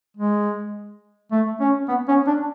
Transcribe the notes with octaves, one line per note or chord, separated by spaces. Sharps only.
G#3
A3
C#4
B3
C#4
D4